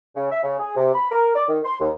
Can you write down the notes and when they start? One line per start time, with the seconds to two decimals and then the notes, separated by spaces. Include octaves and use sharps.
0.16 C#3
0.31 E5
0.44 C#3
0.59 G#4
0.76 C3
0.94 B5
1.12 A#4
1.35 D5
1.49 D#3
1.65 C6
1.80 D#2